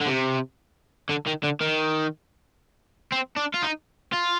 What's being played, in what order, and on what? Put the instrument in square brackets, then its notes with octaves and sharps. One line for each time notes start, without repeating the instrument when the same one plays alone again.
[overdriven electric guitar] D3
C3
D3
D#3
D3
D#3
C4
D4
F4
D#4
F4